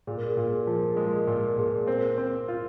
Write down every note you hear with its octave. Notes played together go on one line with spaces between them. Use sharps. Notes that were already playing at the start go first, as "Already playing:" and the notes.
A#2 G#4
A#4
G#4
A#2 A#4
G#4
A#4
F3 G#4
A#4
G#3 G#4
A#4
G#4
A#2 A#4
G#4
A#4
A#2 G#4
C4 A#4
C4
F4